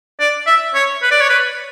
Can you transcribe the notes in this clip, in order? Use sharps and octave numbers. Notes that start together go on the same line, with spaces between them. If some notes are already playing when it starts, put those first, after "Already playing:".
D5
E5
C#5
B4
D5
C#5
B4